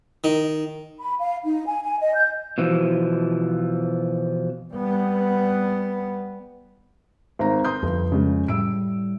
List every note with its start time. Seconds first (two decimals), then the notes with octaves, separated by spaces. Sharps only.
0.24 D#3
1.00 B5
1.19 F5
1.44 D#4
1.67 G#5
1.83 G#5
1.99 D#5
2.15 G6
2.58 B2 E3 F3
4.74 G3 B3
7.39 G#1 A#5
7.65 C6 D#6 G6
7.83 G1 F2
8.12 C#3 G#3
8.48 A2 G3 E6 D7